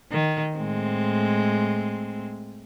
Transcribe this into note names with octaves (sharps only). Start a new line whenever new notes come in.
D#3
A2 G#3 C4